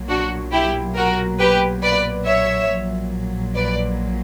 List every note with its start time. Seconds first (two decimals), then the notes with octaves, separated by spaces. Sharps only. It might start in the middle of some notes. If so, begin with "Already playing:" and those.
Already playing: B1 A#2 F#3
0.09 D4 F#4
0.52 E4 G4
0.95 F#4 A#4
1.39 G4 B4
1.82 B4 D5
2.25 C#5 E5
2.69 A#1 A#2 F#3
3.55 B4 D5